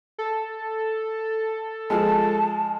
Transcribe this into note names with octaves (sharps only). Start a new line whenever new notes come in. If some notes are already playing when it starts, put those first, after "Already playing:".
A4
F3 G#3 A5